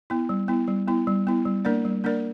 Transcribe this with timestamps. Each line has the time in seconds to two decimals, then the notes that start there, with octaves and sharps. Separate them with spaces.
0.10 B3 E4
0.29 G3
0.48 B3 E4
0.68 G3
0.88 B3 E4
1.07 G3
1.27 B3 E4
1.45 G3
1.65 A#3 D4 A#4 D5
1.85 G3
2.04 A#3 D4 A#4 D5